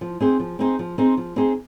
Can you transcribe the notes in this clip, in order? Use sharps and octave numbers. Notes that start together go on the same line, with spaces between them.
F3
C4 D#4 G#4 C5
F3
C4 D#4 G#4 C5
F3
C4 D#4 G#4 C5
F3
C4 D#4 G#4 C5